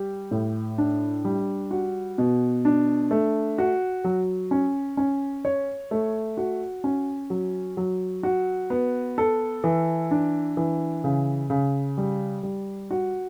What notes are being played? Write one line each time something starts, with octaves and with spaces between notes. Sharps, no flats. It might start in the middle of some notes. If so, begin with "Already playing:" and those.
Already playing: G3 G4
A2
D4
G3
F#4
B2
D4
A3
F#4
F#3
C#4
C#4
C#5
A3
F#4
C#4
F#3
F#3
F#4
B3
A4
E3
D4
E3
C#3
C#3
G3
G3
F#4